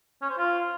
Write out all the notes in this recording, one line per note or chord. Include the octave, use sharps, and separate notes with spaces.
C#4
C5
F4